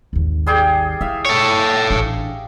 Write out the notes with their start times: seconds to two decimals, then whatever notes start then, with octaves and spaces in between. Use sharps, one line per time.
0.13 G#1 D#2
0.47 G3 G#4 G5
1.01 E4 E5 F5
1.25 A4 C#5
1.90 A1 D4